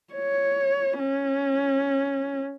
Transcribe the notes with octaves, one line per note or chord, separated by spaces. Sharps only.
C#5
C#4